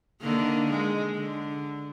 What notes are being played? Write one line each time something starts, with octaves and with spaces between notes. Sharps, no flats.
D3 D#3 A#3
G#3
D3